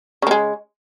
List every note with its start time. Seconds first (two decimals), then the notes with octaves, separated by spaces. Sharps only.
0.22 C#3
0.27 A#3
0.31 G#3